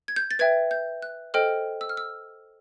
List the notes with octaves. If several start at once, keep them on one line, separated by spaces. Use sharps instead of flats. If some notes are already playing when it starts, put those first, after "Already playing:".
G#6
G6
A6
B4 E5 G5 G#6
G6
F#6
A4 C5 D#5 G5 F6
E6
F6
E6